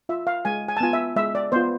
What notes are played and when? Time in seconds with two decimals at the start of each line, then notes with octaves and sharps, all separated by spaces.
0.09 F4 E5
0.27 F5
0.45 G#3 G#5
0.68 G#5
0.77 A5
0.80 B3 F4 G#5
0.93 E5
1.16 G#3 E5
1.35 D5
1.52 B3 F4 C5